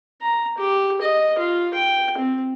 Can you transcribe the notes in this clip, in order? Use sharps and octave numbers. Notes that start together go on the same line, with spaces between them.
A#5
G4
D#5
F4
G5
C4